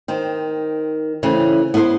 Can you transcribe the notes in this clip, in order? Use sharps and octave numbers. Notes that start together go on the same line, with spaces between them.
D#3 C4
C#3 E3 A3 C4 C#4
B3 E4 G#4 A4 C5